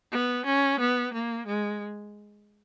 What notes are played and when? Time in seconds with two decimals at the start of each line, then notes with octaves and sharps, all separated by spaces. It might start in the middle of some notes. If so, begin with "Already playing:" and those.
0.12 B3
0.46 C#4
0.80 B3
1.13 A#3
1.47 G#3